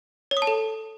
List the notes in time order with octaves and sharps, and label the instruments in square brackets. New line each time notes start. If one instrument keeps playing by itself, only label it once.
[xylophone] C#5
D#6
A5
A4